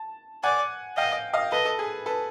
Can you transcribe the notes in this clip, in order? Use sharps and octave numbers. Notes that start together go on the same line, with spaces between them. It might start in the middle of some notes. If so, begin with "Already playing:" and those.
Already playing: A5
D5 F#5 G#5
D#5 F5 G5
D#5 F5
A4 B4 D#5
A4
G#4
A4 B4